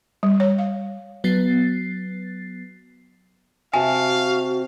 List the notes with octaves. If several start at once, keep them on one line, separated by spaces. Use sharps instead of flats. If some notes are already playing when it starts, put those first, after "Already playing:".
G3
C#5
F5
F#3 B3 A6 C7
C3 F#4 F5 G#5 A5